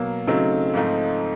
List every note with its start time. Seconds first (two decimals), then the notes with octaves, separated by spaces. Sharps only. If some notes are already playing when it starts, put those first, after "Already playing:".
Already playing: B2 F#3 A#3
0.27 C#3 F#3 A3 C4 D#4
0.74 G#2 F3 A3 C4 D#4